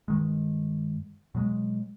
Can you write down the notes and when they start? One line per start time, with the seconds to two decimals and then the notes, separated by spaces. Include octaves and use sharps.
0.08 G2 D#3 G#3
1.35 B2 F#3 G#3